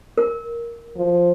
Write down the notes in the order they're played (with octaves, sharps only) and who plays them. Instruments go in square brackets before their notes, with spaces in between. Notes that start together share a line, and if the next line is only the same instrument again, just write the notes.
[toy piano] A#4
[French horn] F3